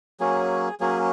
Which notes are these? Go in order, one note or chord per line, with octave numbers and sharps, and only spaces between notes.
F#3 A#3 C#4 G#4
F#3 A#3 C#4 G#4